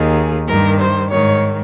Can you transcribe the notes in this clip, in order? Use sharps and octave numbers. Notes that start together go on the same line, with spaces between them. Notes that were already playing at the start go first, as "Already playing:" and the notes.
Already playing: D#2 D#3 G#4
G2 D#3 A#4
C5
G#2 D#3 C#5